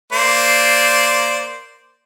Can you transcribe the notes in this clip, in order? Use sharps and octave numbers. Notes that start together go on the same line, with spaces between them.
A#3 C5 D5